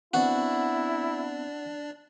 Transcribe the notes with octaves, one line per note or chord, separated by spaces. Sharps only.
B3 C4 D4 E4 F#4 D5